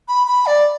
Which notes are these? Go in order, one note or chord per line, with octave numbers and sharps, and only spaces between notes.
B5
B5
D5